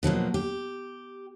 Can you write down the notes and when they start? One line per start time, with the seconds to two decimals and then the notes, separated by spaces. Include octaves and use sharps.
0.03 B2 F3 F#3 A#3
0.34 G4